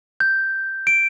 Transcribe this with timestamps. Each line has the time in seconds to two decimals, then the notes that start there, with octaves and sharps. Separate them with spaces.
0.20 G6
0.87 D7